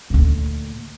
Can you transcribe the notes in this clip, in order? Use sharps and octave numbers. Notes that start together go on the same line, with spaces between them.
D2 A#2